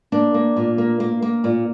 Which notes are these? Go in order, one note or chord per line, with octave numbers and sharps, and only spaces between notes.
A#3 D4
A#3
A#2
A#3
A#3
A#3
A#2